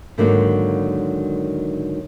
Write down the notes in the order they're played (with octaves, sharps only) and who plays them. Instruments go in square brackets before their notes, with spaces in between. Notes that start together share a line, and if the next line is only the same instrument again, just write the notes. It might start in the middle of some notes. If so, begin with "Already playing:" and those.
[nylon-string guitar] G#2 D3 D#3 F#3 A#3